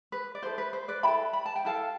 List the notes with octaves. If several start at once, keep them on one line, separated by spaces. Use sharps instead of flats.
B4
D5
E4 A4 C5
B4
C5
B4 D5
E4 A4 G5 B5
B5
A5
G5
E4 A4 F5 A5